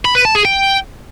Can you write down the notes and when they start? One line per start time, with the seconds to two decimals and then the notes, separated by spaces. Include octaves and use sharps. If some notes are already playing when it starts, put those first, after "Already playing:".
0.05 B5
0.15 B4
0.25 A5
0.35 G#4
0.45 G5